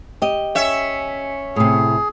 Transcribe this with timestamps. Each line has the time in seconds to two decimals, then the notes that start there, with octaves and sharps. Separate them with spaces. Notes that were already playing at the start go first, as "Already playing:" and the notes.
0.22 G4 D#5
0.55 C#4 E5
1.56 A2 C3 G#4